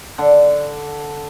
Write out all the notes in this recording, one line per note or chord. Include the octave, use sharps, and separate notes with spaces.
D3